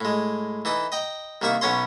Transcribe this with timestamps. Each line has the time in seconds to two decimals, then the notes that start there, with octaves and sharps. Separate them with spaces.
0.01 A2 G#3
0.65 E3 D#4 A4
0.92 D#5 G5 A#5
1.42 C2 D#3 A#3 E5 C#6
1.61 B1 B3 C#4 C#5 A#5 C6